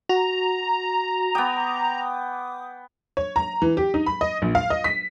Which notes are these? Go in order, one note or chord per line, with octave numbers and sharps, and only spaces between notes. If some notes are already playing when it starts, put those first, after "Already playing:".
F#4 A#5
B3 G5 D6 D#6
C#5
A#5
E3
G4
D#4
B5
D#5
A#1
F5
D#5
B6